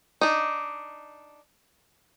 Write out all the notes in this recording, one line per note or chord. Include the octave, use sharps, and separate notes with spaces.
D4 D#4